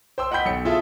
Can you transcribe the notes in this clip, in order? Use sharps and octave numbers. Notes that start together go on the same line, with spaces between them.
C5 G5 C6 E6
D#5 F#5 G5 B5 G6 B6
B1 C#7
E4 F4 G#4 A4 E5